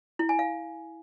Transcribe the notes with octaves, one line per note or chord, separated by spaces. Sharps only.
E4
G#5
F5